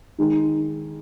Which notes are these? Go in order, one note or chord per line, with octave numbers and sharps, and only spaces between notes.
D#3 G#3 D#4